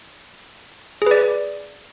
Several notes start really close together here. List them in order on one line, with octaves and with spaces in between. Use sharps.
G#4 B4 D5